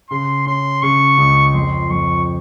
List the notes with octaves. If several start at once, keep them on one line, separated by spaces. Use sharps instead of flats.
C#3 C6
C#4 C6
C#3 C#6
C#2
F2 C6
F2 C#6